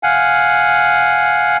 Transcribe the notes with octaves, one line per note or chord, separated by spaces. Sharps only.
F5 F#5 G#5